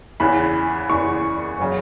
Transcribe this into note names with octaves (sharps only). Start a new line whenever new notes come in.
E2 C#3 E3 B5
E2 C#3 E3 C#6
C#3 F#3